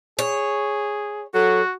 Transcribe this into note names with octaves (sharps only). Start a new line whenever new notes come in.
G#4 C#5
F#3 F#4 A4